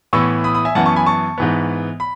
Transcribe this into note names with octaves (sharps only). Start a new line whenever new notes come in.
A2 E3 B3 C#6 E6
B5 D#6
B5 D#6
E5 G#5
F#2 E3 B3 F#5 A5
A5 C#6
G#5 B5
A5 C#6
G#2 E3 B3
B5